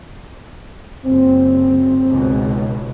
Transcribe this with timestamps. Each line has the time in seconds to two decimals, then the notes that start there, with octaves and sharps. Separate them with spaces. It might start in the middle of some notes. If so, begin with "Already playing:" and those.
1.05 F#1 C4
2.08 C#2 G#2 B2